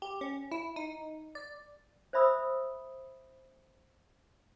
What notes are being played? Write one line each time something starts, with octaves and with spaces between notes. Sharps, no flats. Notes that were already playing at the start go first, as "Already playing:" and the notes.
G4
C#4
E4
D#4
D5
C5 D5 E5 B5 D#6 E6